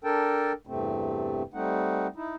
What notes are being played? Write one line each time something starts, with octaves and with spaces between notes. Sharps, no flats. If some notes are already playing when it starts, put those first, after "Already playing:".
D4 A4 A#4 G5 A5
E2 G2 C3 A3 C4
G3 A3 C4 D#4 F#5
D#4 E4